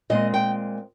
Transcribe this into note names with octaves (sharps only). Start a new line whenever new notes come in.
A#2 G#3 C4 D#5
G5